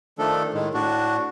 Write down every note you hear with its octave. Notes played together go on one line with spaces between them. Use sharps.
D#3 F3 A3 D4 A4
A2 D#3 G#3
A2 D4 F#4